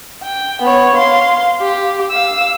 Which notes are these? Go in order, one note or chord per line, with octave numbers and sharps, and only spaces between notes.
G5
B3 C#5
F5 C6
G4
F5 E6